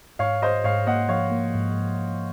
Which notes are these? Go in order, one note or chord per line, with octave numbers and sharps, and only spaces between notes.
G#2 C#5 F5
G#2 C5 D#5
G#2 C#5 F5
A#3 D#5 F#5
F3 C#5 F5
A#3
G#2
G#2
G#2